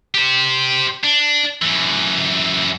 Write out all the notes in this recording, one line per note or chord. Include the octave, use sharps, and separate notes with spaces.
G4 C5
D4
F#2 E3